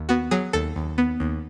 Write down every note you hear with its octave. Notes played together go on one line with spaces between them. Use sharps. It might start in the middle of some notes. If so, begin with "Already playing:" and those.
Already playing: D#2
B3 F#4
F#3 G#4
D#2 A4
D#2
B3
D#2